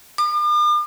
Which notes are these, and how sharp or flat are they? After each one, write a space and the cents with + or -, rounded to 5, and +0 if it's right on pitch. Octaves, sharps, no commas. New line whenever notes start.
D6 +45